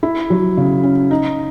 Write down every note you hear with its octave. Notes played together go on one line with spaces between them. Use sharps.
E4
F#3
C#3
C#4
D#4